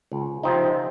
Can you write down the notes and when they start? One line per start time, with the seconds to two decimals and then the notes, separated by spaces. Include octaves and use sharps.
0.12 C#2
0.43 C3 F3 C4 D#4